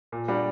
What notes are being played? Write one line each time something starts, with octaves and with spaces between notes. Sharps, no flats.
A#2
G3 D4 F#4